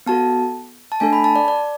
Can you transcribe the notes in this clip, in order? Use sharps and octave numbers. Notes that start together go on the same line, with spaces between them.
B3 F#4 A4 A5
A5
A3 D4 A4 G#5
B5
A5
D5
D5